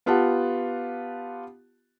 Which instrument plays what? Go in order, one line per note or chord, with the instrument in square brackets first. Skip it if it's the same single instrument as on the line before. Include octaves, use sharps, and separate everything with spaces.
[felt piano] B3 F4 G4 F#5 A5